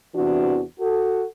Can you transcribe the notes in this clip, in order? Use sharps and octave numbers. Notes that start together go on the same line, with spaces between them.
E2 C3 E3 D4 F#4
F#4 A4